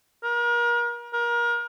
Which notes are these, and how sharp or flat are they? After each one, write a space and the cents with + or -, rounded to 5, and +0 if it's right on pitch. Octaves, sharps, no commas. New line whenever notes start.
A#4 +35
A#4 +30